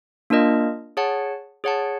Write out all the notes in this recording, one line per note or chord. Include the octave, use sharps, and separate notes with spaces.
A#3 D4 F4 A#4 D#5
G#4 C#5 F#5 A5
G#4 C#5 F#5 A5